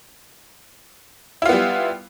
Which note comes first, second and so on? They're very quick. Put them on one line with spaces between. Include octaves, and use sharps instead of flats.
E4 F4 B3 G3